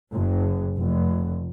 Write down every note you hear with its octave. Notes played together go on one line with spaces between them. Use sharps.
F#1
F1